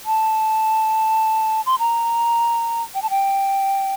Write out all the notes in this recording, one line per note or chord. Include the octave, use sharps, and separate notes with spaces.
A5
C6
A#5
G5
A5
G5